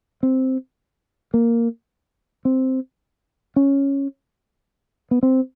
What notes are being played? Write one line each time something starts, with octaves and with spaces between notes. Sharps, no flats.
C4
A#3
C4
C#4
B3
C4